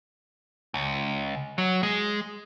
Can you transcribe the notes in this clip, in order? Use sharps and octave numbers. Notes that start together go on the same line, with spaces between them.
C#2
F#3
G#3